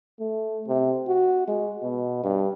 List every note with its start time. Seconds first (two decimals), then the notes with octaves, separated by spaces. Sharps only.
0.19 A3
0.67 C3
1.08 F#4
1.47 G#3
1.83 B2
2.23 G2